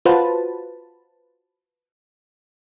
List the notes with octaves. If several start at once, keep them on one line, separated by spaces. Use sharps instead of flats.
F4 F#4 B4 C5 A5